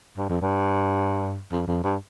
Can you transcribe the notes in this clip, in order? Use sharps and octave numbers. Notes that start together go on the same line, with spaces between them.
G2
F2
G2
F2
F2
G2